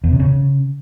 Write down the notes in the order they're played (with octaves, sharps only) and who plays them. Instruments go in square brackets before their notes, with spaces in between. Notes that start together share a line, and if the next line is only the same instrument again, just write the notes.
[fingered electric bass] E2
C3
C#3